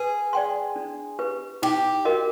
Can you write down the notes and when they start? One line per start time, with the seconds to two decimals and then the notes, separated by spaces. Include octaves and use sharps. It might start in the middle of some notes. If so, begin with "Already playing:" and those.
Already playing: G#4 B4
0.33 D5 G5 C6
0.76 D4
1.19 G4 B4
1.62 D#4 G4
2.05 F#4 A#4 D#5 G5